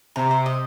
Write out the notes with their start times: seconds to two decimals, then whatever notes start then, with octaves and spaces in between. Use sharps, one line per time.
0.16 C3 A#5
0.31 C5
0.46 D#5